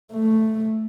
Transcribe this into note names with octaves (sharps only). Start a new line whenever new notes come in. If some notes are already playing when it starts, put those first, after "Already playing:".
A3